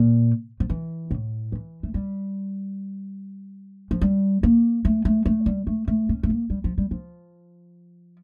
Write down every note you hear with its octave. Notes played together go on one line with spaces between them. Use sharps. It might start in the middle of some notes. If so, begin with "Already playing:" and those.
Already playing: A#2
F3
E3
A2
E3
A3
G3
F3
G3
A#3
A3
A3
A3
G3
A3
A3
C#4
A3
A#3
G3
F3
G3
F3